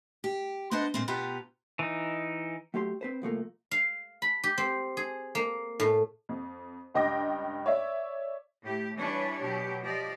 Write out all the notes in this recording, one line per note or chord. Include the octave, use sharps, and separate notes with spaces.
G4
B3 D4 C5 D5 D#5 F#5
A#2 G#3 C4
B2 B3 F4 G4 A#5
E3 D#4
F#3 A3 G4 C6
C4 B4 C5
C2 F3 A3 A#3
F5
B5
G4
C4
G#4
A#3
A2
F2
C#2 G2 D#5 G5 D6 A#6
C#5 D5 E5
A2 G4
E3 G3 D4 B4 C#5
B2 F#3 G4
F3 G4 D5 D#5